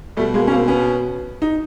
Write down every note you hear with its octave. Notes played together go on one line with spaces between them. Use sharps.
B2 G3 A3
G#3 A#3
C#4
A#3 C4
B3 C#4
D#4